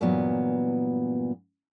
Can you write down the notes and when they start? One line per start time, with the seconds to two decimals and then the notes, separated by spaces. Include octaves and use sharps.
0.01 G2 A#2 E3 F#3 B3